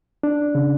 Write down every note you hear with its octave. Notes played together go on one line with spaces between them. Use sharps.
D4
C#3